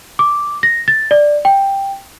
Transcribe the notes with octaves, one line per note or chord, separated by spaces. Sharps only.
D6
A#6
A6
D5
G5